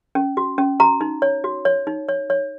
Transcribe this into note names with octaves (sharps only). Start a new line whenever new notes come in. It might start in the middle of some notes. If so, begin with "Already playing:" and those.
C#4
F#4
C#4
F#4 A#5
D#4
C#5
F#4
C#5
D#4
C#5
C#5